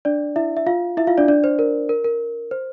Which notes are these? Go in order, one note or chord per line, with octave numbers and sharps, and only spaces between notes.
D4 D5
E4 E5
E5
F4 F5
E4 E5
F4 F5
D4 D5
D4 D5
C5
A#4
A#4
A#4
C5